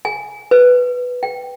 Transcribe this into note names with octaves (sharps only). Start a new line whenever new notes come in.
G#5
B4
G5